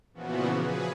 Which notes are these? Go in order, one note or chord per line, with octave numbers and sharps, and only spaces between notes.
A#2 C#3 E3 F3 B3 F#4
G#4 B4